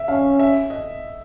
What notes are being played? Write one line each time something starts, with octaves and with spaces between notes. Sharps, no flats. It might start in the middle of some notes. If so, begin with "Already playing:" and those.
Already playing: E5
C#4 F5
E5
D#5